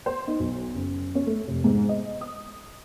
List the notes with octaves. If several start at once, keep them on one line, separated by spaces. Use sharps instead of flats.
C5
D#4
B1
F#1
C#4
A3
F1
G#2
D#5
D#6